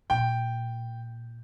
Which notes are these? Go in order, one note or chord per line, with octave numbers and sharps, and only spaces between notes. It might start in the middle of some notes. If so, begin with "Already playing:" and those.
A#2 G5